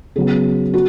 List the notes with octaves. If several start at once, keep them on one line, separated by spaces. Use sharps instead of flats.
C#3 F#3 B3 G#4
F#4